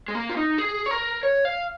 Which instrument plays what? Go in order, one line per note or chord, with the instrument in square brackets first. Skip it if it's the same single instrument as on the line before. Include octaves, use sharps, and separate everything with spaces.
[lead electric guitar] G#3
A#3
F4
D#4
G#4
C#5
A#4
C#5
F5